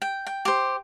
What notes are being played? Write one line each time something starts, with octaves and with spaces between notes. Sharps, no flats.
G5
G5
G4 C5